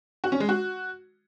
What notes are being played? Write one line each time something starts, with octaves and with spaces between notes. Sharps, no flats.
F#4
C#4
G#3
F#4